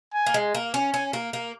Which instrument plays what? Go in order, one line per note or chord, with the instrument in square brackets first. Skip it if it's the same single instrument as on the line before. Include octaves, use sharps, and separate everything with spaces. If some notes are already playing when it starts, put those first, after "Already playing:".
[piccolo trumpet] G#5
[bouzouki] A#3
G#3
A#3
C#4
[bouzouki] C#4 [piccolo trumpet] G#5
[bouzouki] A#3
A#3